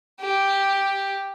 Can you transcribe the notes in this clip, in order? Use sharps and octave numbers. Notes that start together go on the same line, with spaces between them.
G4